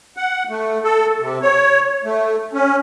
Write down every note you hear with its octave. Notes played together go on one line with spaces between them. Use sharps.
F#5
A3
A4
C3
C#5
A3
C#4